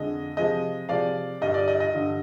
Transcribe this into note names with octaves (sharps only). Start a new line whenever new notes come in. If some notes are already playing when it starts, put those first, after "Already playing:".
Already playing: F2 D3 G#3 D#5
C3 F3 G#3 D#5
C3 F3 G#3 D5 F5
G2 D3 G3 D#5
D5
D#5
D#5
G2 D3 G3